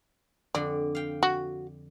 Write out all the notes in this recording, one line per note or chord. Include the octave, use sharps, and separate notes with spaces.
F2 D3 D5
F5 G5
F#4